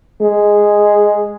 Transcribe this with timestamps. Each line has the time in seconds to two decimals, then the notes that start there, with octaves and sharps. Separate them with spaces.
0.22 G#3